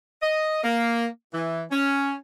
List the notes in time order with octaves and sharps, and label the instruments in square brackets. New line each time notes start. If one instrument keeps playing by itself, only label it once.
[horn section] D#5
A#3
E3
C#4